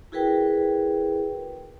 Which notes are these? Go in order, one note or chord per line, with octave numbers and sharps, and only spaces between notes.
E4 F#4 G#4 A#4 B4 G5